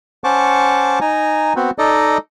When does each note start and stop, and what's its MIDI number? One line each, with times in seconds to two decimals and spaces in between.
0.24 0.99 61
0.24 0.99 72
0.24 0.99 78
0.24 0.99 81
0.24 0.99 85
0.24 0.99 86
1.01 1.53 63
1.01 1.53 80
1.01 1.53 82
1.56 1.70 59
1.56 1.70 60
1.56 1.70 66
1.78 2.18 63
1.78 2.18 69
1.78 2.18 74
1.78 2.18 75